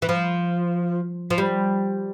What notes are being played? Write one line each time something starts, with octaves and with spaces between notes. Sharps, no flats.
E3
F3
F3
G3